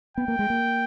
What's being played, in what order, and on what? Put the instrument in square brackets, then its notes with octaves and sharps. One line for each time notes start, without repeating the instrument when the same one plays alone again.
[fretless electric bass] B3 [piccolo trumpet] G5
[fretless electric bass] A#3
G#3
A#3